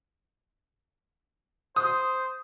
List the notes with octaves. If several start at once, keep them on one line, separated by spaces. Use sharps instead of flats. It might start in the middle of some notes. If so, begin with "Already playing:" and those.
C5 D#6